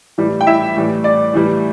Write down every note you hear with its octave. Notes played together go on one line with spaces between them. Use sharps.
A2 E3 G3
G5
E4 E5
A2 E3 G3
D5
A2 E3 G3